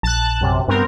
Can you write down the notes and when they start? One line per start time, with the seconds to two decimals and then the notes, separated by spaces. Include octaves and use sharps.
0.03 A#1 A5 F#6
0.41 F#2 C3
0.68 G2 B3 C4 A#4